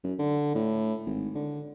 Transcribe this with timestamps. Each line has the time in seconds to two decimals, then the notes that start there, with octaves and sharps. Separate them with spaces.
0.04 F#2
0.19 D3
0.55 A2
1.06 G#1
1.35 D3